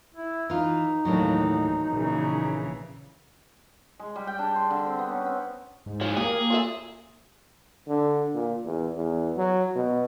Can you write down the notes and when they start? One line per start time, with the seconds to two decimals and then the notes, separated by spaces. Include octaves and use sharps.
0.15 E4
0.50 E3 D#4 F4
1.05 D#2 A2 E3 F#3 A#3 D4
1.93 A#1 C#3 E3
4.00 G#3
4.16 G3
4.27 G5
4.39 D4
4.56 C6
4.70 D3
4.86 C4
4.99 B3
5.11 C#4
5.26 C4
5.86 G#2
6.01 E3 F3 C#5
6.17 A#3 G4 G#4
6.50 F4 A4 E5
7.87 D3
8.34 A#2
8.65 E2
8.96 E2
9.37 F#3
9.75 B2